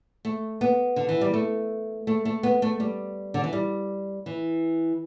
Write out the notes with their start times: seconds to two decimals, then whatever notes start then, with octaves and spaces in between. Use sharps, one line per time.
0.25 A3
0.61 B3
0.96 D3
1.09 E3
1.21 G3
1.34 A3
2.07 A3
2.25 A3
2.43 B3
2.62 A3
2.80 G3
3.34 D3
3.44 E3
3.53 G3
4.26 E3